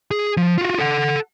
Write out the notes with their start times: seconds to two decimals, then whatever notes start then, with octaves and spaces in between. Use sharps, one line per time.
0.11 G#4
0.37 F3
0.58 F4 F#4
0.79 A4 F#5